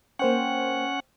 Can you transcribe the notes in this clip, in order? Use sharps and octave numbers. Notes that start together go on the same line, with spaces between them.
A#3 C#4 C5 F#5 G5